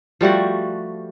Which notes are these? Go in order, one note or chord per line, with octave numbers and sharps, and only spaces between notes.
F3 G3 A3 F#4